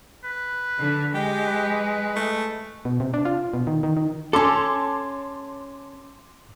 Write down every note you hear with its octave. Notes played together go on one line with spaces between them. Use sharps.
B4
D3
G#3 G4
B4
A3
B2
C3
D4
F4
B2
D#3
D#3
D#3
C#4 A4 A5 C6 D6